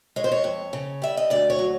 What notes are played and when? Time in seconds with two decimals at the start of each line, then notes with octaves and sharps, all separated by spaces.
0.16 G#3 C#5
0.24 C5
0.31 C#5
0.44 F2
0.73 C#3
1.02 G3 E5
1.17 D#5
1.30 D2 D5
1.50 C#5
1.59 F#3